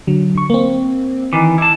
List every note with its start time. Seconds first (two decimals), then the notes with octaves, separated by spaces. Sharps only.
0.07 D3 F#3
0.35 D3 C#6
0.50 A#3 C4
1.33 D#3 E3 D6
1.58 E4 A5